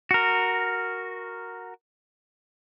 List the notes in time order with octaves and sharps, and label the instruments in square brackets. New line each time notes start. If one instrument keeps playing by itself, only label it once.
[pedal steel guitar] F#4 A#4